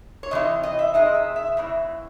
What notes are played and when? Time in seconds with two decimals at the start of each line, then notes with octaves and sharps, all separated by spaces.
0.23 C#5
0.31 C3 E3 D#4 D#5
0.63 D#5
0.79 E5
0.94 C3 E3 G#3 D#4 D#5
1.15 E5
1.36 E5
1.57 E2 C#3 E3